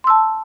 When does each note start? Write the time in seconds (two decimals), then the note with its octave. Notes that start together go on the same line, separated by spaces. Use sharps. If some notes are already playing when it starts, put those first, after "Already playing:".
0.04 C6
0.07 E6
0.10 A5